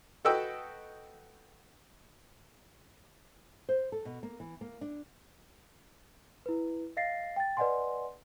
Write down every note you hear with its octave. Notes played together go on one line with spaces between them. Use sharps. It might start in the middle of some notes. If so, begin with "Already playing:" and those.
F#4 A4 B4 D#5 G5 E6
C5
A4
B2
A#3
E3
A#3
D4
E4 B4
D#5 F5 A6 A#6 C7
G5 A6
B4 D5 D#5 F#5 G#5 C6